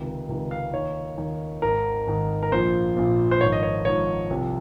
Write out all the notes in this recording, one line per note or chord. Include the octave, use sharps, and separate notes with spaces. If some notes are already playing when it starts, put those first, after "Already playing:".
Already playing: C#2 C3 D#3
C#2 C3 D#3
F5
D#2 D#3 C#5
D#2 D#3
G#1 G#2 D#3 A#4
G#1 G#2 D#3
A#4
A#1 A#2 F3 C5
A#1 A#2 F3
C5
G#1 G#2 F3 C#5
D#5
C#5
G#1 G#2 F3 C#5
C2 C3 F3